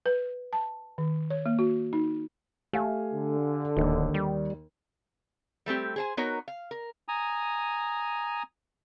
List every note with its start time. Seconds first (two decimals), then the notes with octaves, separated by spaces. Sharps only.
0.06 B4
0.53 A5
0.98 D#3
1.30 C#5
1.46 A#3
1.59 F#4
1.93 D#4
2.73 A3 G4 F5 G#5
3.13 D3
3.77 D1 D#2 D#5
4.14 G3
5.66 G3 A3 C4 G4
5.96 G#4 C5 G#5
6.17 B3 D#4 F#4 A#4 C#5
6.48 F5
6.71 A#4
7.08 G#5 A#5 D#6